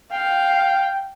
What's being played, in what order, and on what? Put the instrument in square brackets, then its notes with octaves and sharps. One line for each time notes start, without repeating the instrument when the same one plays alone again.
[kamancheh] F5 [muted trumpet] G5